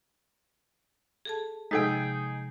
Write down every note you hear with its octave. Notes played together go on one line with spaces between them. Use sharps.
G#4 A4 A5
C3 F3 G#3 D#4 G#4 G5